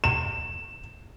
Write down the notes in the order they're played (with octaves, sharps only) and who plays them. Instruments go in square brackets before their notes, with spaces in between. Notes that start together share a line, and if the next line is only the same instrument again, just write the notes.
[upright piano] E7